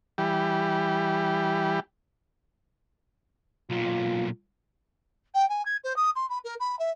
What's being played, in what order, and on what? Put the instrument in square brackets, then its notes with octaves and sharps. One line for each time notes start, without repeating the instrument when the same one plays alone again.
[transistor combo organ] E3 G3 G4
[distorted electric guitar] B1 A#2 [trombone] F4
[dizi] G5
G#5
G#6
C5
D#6
C6
B5
A#4
B5
E5